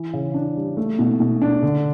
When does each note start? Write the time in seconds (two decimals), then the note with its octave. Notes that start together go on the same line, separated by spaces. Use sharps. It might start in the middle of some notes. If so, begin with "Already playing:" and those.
Already playing: E3
0.13 C#3
0.34 D4
0.57 G3
0.77 A3
0.99 B2
1.20 B2
1.42 D4
1.63 D3